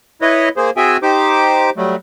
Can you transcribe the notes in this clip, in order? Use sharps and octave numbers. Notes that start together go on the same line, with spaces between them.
E4 B4 C#5 D#5
A#3 G#4 C5
C4 F#4 G#4 E5 G5 G#5
D#4 G4 C5 D6
F#3 G3 A3